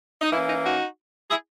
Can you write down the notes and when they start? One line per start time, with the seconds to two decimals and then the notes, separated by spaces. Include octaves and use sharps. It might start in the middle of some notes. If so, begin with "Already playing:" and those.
0.20 D#4
0.31 E3 A#3 C#4 E4
0.47 D#4
0.64 D#4 F#4
1.30 E4 G#4